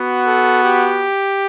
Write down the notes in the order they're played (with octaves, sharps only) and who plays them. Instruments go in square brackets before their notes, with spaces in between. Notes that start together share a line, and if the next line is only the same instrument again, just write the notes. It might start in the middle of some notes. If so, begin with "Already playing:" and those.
Already playing: [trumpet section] B3 F#4
A4
G4